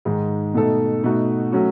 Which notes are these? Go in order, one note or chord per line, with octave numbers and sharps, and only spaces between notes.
G#2 D#3 G#3
B2 A3 D#4 A4
B2 A3 D#4 F#4
F#3 A3 C#4 F#4